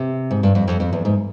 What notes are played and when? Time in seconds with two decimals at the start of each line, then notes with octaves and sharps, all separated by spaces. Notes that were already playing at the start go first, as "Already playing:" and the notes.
Already playing: C3
0.31 G#2
0.43 G2
0.55 F2
0.68 F2
0.80 F2
0.93 E2
1.05 G#2